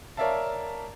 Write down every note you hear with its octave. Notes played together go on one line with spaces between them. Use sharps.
A#4 C#5 D5 E5 F5 A5